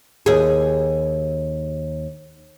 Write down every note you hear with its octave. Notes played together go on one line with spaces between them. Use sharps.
D#2 G#4